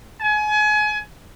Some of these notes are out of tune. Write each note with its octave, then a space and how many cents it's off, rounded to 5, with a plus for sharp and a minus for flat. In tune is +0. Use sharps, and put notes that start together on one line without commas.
G#5 +30